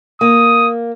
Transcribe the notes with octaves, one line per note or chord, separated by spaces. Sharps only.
A#3 D#6